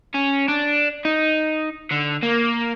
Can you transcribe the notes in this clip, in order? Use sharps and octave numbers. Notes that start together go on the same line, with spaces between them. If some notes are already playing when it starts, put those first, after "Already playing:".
C#4
D4
D#4
D3
A#3